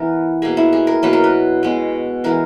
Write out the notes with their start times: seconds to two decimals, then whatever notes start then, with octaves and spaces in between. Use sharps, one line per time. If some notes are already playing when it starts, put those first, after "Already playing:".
Already playing: E3 B3 A#4
0.42 B2 A#3 G#4
0.57 E4
0.73 G#4
0.87 A#4
1.03 B2 F#3 A#3 B4
1.13 A#4
1.24 B4
1.63 B2 G#3 B3
2.24 E3 G#3 B3 A#4